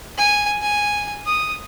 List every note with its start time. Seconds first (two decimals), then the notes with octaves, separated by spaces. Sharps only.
0.18 G#5
0.62 G#5
1.26 D#6